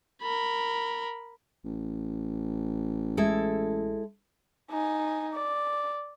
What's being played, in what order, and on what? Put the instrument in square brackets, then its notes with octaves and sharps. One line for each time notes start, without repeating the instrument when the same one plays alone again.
[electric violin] A#4 B5
[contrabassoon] A1
[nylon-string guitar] G#3 E4 A4
[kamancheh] D#4 G#5
D5